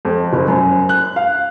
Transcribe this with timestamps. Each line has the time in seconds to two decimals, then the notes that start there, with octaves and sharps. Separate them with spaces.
0.05 F2
0.33 F#1
0.48 F#2
0.89 F#6
1.16 F5